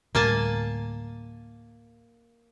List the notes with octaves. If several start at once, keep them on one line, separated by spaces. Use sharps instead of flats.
D2 A2 G3 A#3 G#5 A5